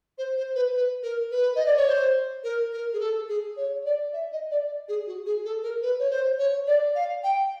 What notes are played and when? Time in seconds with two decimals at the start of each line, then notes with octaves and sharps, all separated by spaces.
0.18 C5
0.37 C5
0.55 B4
0.74 B4
1.03 A#4
1.31 B4
1.55 D#5
1.66 D5
1.76 C#5
1.88 C5
2.44 A#4
2.72 A#4
2.93 G#4
3.00 A4
3.28 G#4
3.57 C#5
3.85 D5
4.13 E5
4.32 D#5
4.51 D5
4.88 G#4
5.07 F#4
5.26 G#4
5.45 A4
5.63 A#4
5.82 B4
5.99 C#5
6.11 C5
6.38 C#5
6.67 D5
6.95 F5
7.24 G5